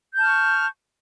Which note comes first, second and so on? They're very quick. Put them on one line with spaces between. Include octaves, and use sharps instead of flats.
G6 A5 F6 C#6